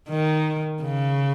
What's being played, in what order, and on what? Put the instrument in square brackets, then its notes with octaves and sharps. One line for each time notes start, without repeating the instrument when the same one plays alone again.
[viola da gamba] D#3
C#3